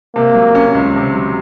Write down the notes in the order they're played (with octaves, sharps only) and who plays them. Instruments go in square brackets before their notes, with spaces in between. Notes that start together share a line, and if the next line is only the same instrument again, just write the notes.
[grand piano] C3 [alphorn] A#3
[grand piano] F#3
C#4
C#2
C3
F#3